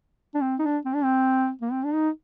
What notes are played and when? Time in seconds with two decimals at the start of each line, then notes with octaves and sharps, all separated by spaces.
0.34 D4
0.41 C4
0.59 D#4
0.63 D4
0.86 C4
0.95 D4
1.04 C4
1.62 A#3
1.72 C4
1.85 D4
1.94 D#4